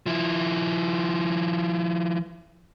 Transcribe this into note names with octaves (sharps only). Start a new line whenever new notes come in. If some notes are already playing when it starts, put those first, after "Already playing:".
F3 E4